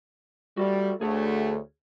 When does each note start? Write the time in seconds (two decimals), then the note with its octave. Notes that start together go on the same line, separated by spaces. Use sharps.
0.57 G3 F#4 A4 D5
1.01 D2 A3 G#4 C#5